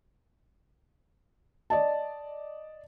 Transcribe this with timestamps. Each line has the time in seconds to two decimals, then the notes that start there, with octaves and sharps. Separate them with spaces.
1.70 D5 D#5 A5